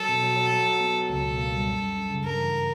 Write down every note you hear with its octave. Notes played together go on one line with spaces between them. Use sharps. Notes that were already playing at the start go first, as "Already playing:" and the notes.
Already playing: F#3 A4
B2
F#3
F#3
F#3
F#3
B3
F#3
C#2 A4
B2
A#3
G3
F#2
F#2
F#2
C#3
G2 A#4
E3